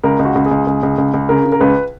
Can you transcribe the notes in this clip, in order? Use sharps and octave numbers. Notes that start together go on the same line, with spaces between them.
C#2 A#4
C#2
F#4
C#2
G#4
C#2
C#2
C#2
C#2
C#2
C#3 A#4
C#3
A#4
C#2 B4